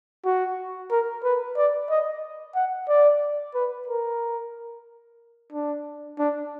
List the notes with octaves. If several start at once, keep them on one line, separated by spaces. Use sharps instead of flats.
F#4
A#4
B4
D5
D#5
F#5
D5
B4
A#4
D4
D4